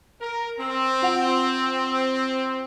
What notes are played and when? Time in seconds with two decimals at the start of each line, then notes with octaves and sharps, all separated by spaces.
0.21 A#4
0.59 C4
1.02 F4 F#5 F7